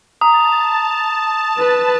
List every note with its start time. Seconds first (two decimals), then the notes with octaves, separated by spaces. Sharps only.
0.21 A5 A#5 D#6
1.58 B4